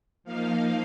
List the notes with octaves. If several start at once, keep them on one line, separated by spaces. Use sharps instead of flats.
F3 A#3 D#4 F5